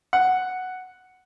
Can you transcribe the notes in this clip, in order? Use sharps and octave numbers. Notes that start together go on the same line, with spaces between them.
F#5